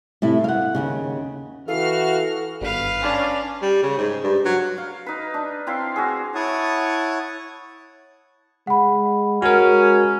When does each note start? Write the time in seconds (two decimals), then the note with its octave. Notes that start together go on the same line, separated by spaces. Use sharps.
0.22 A2 C3 E4
0.44 F5 F#5
0.75 D#2 A#2 C#3
1.68 E3 F#4 A4 F5 F6
2.61 G#1 G2 B3 B4 F5
3.02 C#4 D4
3.62 G3
3.83 C#3
3.98 G#2
4.23 G2
4.45 F#3
4.78 F5
5.06 D#4 B4
5.34 D4
5.67 C4 E4 F5 C6
5.96 F#4 G#4
6.35 E4 C#5 F#5 A5 C#6 D#6
8.67 G#3 F#5 B5
9.42 G#3 C#4 F#4 A#4